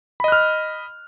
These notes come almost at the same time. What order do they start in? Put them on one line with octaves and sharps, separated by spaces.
B5 D#5 F#6 F6